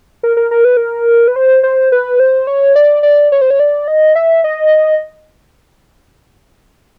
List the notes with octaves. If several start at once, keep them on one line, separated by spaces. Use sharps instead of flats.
A#4
A#4
A#4
B4
A#4
B4
C5
C5
B4
C5
C#5
D5
D5
C#5
C5
C#5
D5
D#5
E5
D#5